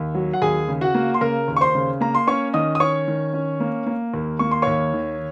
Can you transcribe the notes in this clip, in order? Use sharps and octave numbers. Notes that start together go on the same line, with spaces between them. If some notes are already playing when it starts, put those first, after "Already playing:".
Already playing: D#2
F#3
F#5
D#2 G#4 G#5
C#3
F#4 F#5
A#3
C6
C#3 A#4 A#5
D#2
C#6
C5 C6
C#3
A#3 A#5
C6
C#4 C#5 C#6
D#3 D#5 D#6
D#6
C#4 C#5 C#6
D#3
C#4
A#3
A#3
D#2
A#3 C#6
C6
D#2 C#5 C#6
D#3